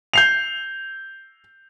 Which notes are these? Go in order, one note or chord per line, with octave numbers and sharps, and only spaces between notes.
G6 C7 F7